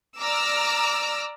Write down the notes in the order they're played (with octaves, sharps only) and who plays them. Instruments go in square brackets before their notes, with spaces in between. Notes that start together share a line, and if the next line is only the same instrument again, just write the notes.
[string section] D5 A#5 D6 E6 F6